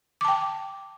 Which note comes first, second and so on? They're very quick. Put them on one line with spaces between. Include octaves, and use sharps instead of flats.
D6 A5 G5